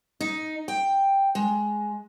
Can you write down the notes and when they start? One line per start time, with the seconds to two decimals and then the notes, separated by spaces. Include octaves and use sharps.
0.21 D#4
0.68 G5
1.35 G#3